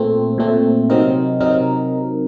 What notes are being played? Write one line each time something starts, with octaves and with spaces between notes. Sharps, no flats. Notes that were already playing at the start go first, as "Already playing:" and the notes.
Already playing: A#2 A3 C4
A#2 A3 C4
C3 F#3 C4 D#4 A#4
C3 F#3 C4 D#4 A#4